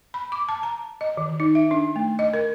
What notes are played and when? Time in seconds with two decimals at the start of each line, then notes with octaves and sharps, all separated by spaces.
0.14 B5
0.32 D6
0.49 A5
0.63 A#5
1.01 D#5
1.17 D#3
1.40 D#4
1.55 E5
1.71 D4
1.96 A3
2.19 D#5
2.34 A#4